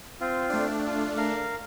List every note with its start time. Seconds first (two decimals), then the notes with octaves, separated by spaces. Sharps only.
0.21 C4 F4
0.50 A3 D4
0.87 F4
1.17 A#4 F5